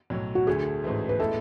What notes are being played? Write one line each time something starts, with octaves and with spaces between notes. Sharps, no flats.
B1 A2 F#3
F#4
D2 D3 A3 G#4
A1 G#2 E3 A3
B4
A2 G#3 B3 E4 A4